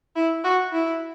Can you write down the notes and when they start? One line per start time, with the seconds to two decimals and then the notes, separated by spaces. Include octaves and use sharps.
0.16 E4
0.44 F#4
0.72 E4